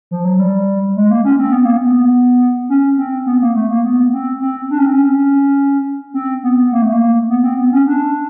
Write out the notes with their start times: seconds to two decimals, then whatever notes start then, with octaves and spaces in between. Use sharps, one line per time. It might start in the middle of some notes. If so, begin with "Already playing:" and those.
0.11 F3
0.25 F#3
0.39 G3
0.96 G#3
1.10 A#3
1.25 C#4
1.39 C4
1.52 B3
1.65 A#3
1.77 B3
2.69 C#4
2.98 C4
3.26 B3
3.41 A#3
3.55 A3
3.69 A#3
3.84 B3
4.13 C4
4.42 C4
4.71 D4
4.78 C#4
4.86 C4
4.93 C#4
6.14 C4
6.43 B3
6.72 A#3
6.82 A3
6.93 A#3
7.29 B3
7.44 C4
7.58 B3
7.73 C#4
7.87 D4